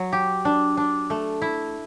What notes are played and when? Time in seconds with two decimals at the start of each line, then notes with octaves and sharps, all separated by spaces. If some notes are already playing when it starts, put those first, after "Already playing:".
Already playing: F#3
0.12 G4
0.45 D4
0.77 D4
1.10 A3
1.42 E4